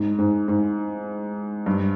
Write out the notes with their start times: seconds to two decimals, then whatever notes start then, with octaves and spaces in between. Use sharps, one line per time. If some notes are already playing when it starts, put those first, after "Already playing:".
Already playing: G#2
0.19 G#2
0.48 G#2
1.66 G2